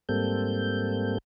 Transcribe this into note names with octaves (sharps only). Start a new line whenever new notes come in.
G#2 G3 A#3 C4 A4 G6